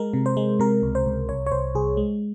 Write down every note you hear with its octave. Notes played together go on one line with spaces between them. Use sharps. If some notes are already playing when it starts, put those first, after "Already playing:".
Already playing: G#3 A#4
C3
C5
G#3
C3 A#4
C#2
C5
C#2
C2 C#5
C#5
C2 C5
C2 G#4
G#3